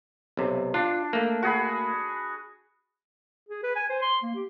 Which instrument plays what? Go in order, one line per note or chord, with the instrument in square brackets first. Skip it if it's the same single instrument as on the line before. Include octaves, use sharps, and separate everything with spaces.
[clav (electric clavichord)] B1 C3
[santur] D4 [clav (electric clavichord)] F4
[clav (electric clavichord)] A3 A#3
[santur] F#4 G#4 B5
[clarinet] G#4
B4
G#5
C5
C6
A#3
G4